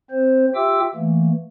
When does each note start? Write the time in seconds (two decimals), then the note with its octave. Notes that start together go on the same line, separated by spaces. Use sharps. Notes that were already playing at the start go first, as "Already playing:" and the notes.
0.11 C4 C5
0.55 F4 G4 E5 G5 D6 E6
0.95 E3 A3 A#3